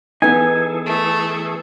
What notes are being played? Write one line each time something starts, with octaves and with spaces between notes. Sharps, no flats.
E3 B3 D#4 G#4 A4 G#5
A3